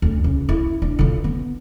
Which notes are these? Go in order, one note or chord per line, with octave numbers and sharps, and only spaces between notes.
D2
C#2
E4
D4
D3 F4
B3